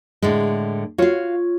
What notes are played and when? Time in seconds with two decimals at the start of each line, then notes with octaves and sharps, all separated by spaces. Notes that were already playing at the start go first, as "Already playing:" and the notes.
0.22 A2 D3 G#3
0.98 F4 F#4 C#5 F5